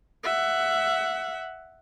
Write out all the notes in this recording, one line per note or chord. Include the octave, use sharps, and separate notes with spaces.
E5 F#5